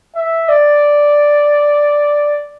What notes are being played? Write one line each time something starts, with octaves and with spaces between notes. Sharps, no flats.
E5
D5